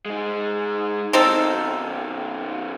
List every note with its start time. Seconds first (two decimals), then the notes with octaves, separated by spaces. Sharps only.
0.06 G#3 D#4
1.13 F#2 D#3 C4 D#4 A4